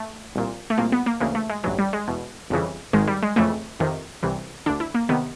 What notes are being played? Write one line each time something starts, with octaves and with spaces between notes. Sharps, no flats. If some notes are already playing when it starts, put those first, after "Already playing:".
Already playing: A3
C2 A#2
A3
C2 A#2 A#3
B3
A#3
D2 C#3 E3 A#3
A3
G#3
A1 G2 E3 F#3
G3
G#3
E2 B2
G1 F2 C#3 E3
G#1 G#2 D#3 G#3
G3
G#3
F2 C#3 E3 A3
F2 C3 D#3
C2 C3 E3
D2 D3 D4
E4
A#3
C3 D#3 B3